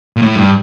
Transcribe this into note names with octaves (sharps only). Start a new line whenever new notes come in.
A#2
A2
G2